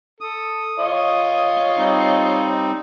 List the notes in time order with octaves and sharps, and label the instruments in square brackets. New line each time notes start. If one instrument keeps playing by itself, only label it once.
[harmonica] A4 [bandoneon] D#6
[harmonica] F4 C#5 D#5
[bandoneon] G3 C4 D#4